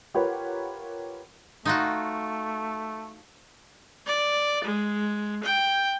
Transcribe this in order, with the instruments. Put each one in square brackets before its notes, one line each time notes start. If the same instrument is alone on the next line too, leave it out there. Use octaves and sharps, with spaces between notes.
[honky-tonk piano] F4 G4 A#4 B4 C#5 F#5
[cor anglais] A3 [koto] D#4 F4 F#4
[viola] D5
G#3
G5